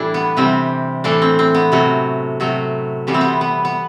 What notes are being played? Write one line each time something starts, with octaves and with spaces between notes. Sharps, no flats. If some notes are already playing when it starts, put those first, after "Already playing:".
Already playing: A2 E3 G3 D4 E4
B3
C3 E3 G3 C4
A2 E3 A3 D4
C4
C4
B3
C3 F#3 A3
C3 F#3 A3
C3 E3 G3 B3
C4
B3
B3
B3